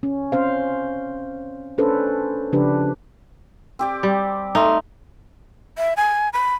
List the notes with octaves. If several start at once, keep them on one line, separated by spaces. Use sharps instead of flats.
C#4
C4 C#4 C5 F5
C#4 D4 A4 B4 C5
C#3 F3 D4 G4 B4
C4 G4 D5
G3
A3 D#4 C6
E5
G#5
B5